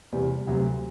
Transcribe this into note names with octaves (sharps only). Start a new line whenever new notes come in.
E2 C3 G3
D2 C3 F#3